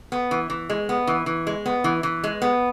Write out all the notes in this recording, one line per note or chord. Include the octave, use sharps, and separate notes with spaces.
B3
E3
E3
G#3
B3
E3
E3
G#3
B3
E3
E3
G#3
B3